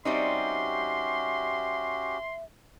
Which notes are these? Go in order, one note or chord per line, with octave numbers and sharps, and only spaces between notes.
G3 C4 C#4 D#4 F#4 G4 E5 C6